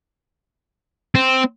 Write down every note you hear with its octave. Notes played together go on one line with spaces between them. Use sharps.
C4